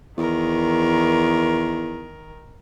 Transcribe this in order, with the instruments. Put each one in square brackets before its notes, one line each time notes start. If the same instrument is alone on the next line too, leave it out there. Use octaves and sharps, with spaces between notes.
[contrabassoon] E2 [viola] D#3 A#4